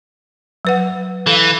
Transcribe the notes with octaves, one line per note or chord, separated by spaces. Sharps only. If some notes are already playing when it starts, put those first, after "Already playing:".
F#3 B4 F#5
E3 A4 F5